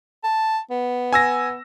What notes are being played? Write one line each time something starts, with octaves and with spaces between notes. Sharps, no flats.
A5
B3
G#5 E6 A#6